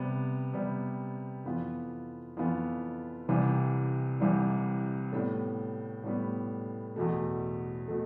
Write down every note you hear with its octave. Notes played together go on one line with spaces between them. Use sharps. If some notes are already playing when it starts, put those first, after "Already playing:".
Already playing: C3 G3 B3
C3 G3 B3
F2 E3 B3 F4
F2 E3 B3 F4
C2 C3 E3 G3
C2 C3 E3 G3
A2 G3 B3
A2 G3 B3
E2 B2 A3
B2 A3